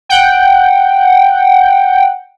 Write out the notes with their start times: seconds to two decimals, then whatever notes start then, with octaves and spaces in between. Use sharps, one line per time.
0.09 F#5 G5